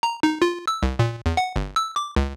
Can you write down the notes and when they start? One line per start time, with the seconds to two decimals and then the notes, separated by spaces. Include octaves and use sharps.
0.03 A#5
0.23 D#4
0.42 F4
0.67 E6
0.83 C2
0.99 A#2
1.26 E2
1.37 F#5
1.56 G1
1.76 E6
1.96 D6
2.16 C#2